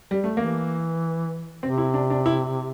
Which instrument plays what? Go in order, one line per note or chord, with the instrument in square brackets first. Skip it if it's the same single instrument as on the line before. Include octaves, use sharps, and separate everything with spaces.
[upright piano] G3
A3
[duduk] E3 [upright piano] A#3
[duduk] C3 [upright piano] C4
[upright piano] E4
D4
D4
E4